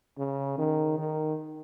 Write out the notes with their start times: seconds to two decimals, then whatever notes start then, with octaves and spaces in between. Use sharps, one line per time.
0.18 C#3
0.58 D#3
0.98 D#3